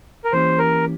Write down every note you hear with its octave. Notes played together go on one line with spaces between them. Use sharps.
A#4
E3 A#3 C#4 G4 C5
A#4